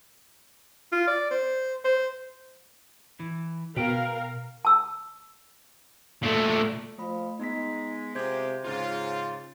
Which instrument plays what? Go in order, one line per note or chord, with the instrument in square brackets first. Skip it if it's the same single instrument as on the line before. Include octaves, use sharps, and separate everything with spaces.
[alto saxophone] F4
D5
C5
C5
[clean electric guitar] E3
[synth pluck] B2 [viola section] A#4 F5 [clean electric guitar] B4 G5
[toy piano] A5 E6
[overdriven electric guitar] A#2 A3
[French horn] F3 [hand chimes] A3 B5
[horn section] G#3 [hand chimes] B3 B6 [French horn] D#4
[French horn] C3 [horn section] G#3 F4 G4 [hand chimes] C5 G6 G#6
[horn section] G#2 F4 [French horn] C#3